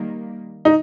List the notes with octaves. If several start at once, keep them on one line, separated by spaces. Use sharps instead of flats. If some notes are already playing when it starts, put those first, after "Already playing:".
Already playing: D#3 G3 A#3
D#4